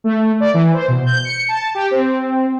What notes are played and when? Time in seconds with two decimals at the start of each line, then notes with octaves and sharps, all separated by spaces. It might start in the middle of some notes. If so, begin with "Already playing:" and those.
0.04 A3
0.40 D5
0.54 E3
0.73 C5
0.88 B2
1.06 G6
1.24 C#7
1.48 A5
1.75 G4
1.91 C4